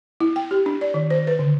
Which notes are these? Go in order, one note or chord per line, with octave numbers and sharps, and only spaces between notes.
E4
G5
G4
D4
D5
D#3
C5
B4
D3